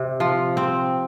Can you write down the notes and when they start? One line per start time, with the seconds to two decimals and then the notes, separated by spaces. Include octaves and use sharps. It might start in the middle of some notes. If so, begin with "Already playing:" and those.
Already playing: C3
0.20 F3
0.57 C4